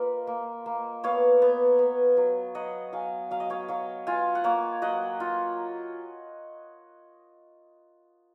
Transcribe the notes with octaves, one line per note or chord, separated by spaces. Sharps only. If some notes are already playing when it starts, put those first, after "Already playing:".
Already playing: A#3 F4 B4 D#5
A#3
A#3
B3 C#5 F5
B3
B3
F#3
F#3 D#5 F#5
F#3 F5 G#5
F#3 F5
D#5
C#5 F5
F#3 C#5 F5
F4 F5 G#5
F#5
A#3 C#5 F5
F#3 D#5 F#5
F4